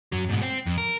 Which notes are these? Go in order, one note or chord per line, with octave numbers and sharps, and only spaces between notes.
F#2 F#3
G#2 B2
C5 G5
F2
A#4